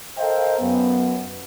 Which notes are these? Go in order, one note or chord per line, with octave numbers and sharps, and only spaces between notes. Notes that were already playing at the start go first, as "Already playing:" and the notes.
A4 A#4 C5 D#5 F5 G5
F#2 B3